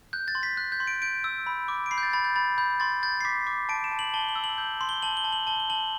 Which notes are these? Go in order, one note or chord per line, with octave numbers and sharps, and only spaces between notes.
F#6 G6
A6
C6
B6
F#6
G6
C6
D7
G6 D7
E6
B5
D6
D7
B5 C7
G6
A6
B5 A6
G6
B5 A6
B5 G6
C6 A6
G6 A6
C7
D6 B6
D6
A5 D7
E7
A5
F#7
A5 G7
F#7
E6
F#7
G6
C6
G7
A5 F#7
G7
A5
F#7
A5 G7
G7
A5 F#7